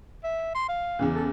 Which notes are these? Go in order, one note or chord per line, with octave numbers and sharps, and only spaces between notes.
E5
C6
F5
E2 C#3 E3
A4